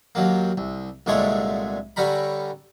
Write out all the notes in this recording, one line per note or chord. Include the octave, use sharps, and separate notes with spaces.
D#2 F#3 A#3
C2
C2 A#2 D3 G#3 A3 C#5
D3 G3 C#4 A#5 B5